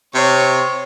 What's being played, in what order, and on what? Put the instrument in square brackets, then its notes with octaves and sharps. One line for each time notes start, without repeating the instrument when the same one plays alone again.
[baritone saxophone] C3 [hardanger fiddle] C#5